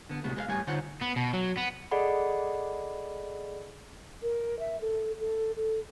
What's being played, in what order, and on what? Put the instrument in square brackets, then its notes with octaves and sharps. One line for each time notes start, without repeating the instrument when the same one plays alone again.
[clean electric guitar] D3 B3
A2 C3 G#3 B3 F#4
G#3 B4 F5
A2 G3 B3 C#5 G#5
D3 D#4 F4 C5 C#5 F#5
[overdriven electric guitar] B3
B2
F#3
B3
[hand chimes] G#4 A4 D5 D#5 F#5 B5
[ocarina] A#4
E5
A4
A4
A4